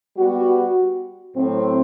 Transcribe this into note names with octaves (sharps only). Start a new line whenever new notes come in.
G3 B3 F#4
A2 F#3 C4